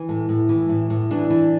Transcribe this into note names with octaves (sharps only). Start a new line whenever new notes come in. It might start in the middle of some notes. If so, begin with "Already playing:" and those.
Already playing: E3
A2
A2
E3
A2
A2
E3 D4
E3